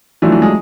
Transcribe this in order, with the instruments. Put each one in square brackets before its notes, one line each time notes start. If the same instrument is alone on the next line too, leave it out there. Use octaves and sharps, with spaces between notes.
[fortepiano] E3 [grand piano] F#3 A3 D4 F4
[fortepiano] E3
G#3